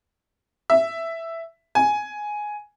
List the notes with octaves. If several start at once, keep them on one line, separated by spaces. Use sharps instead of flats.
E5
G#5